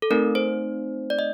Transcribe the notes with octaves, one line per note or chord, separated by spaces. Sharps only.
A4
A3 C4 D#4 A#4
C5
D5
D#5